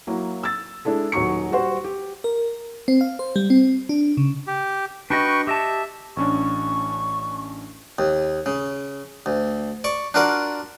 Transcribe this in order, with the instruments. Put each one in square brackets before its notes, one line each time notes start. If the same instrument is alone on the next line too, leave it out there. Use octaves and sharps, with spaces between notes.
[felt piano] F#3 A#3 E4
E6 A6
G#3 D4 E4 A4
D#1 F#3 D#4 C#6 C#7
G3 F#4 C5
G4
[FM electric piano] A#4
C4
F5
C5
G3
C4
D4
C#3
[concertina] G4
[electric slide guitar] D4 F#4 D#5 [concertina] B4 G5 C#6
[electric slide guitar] G4 D#5 A5 [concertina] E5
[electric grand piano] A1 C#4 D4 [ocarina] C#6
[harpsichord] D#2
C#3
D2
D5 C#6
D4 F4 F#4 A#4 D5